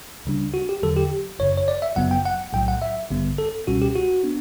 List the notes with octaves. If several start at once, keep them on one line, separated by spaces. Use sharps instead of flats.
D2 C#3 G3 D4
F#4
G4
E2 D3 F#3 A4
G4
G1 F#2 C#3 C#5
C#5
D5
E5
G1 F#2 C#3 F#3 B3 F#5
G5
F#5
B1 A2 F#3 G5
F#5
E5
A1 G2 D3 G3 B3
A4
C#2 B2 G3 C#4 F#4
G4
F#4
B3 D4